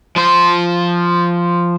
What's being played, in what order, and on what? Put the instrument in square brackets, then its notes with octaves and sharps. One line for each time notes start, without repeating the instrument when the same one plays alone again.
[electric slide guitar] F3 C5